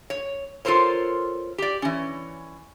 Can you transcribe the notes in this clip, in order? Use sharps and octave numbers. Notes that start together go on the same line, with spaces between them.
C#5
F4 A4 A#4 C5 C#5
G4 D5
E3 C#4